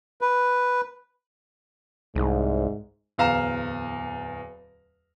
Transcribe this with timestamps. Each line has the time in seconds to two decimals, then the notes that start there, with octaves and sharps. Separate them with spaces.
0.21 B4
2.15 C2 G#2
3.18 D1 E2 F5 A#5 E7